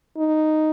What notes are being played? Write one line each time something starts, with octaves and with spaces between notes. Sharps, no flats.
D#4